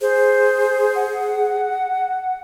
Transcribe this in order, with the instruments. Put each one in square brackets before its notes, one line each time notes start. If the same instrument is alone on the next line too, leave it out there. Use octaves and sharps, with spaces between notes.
[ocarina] G#4 [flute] C5
[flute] F#5